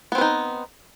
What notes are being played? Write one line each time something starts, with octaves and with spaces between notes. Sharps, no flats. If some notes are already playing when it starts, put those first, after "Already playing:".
B3 C4 D#4 B4